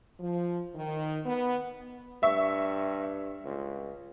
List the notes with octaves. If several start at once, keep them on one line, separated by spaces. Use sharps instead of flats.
F3
D#3
B3
G2 E5 C#6
C#2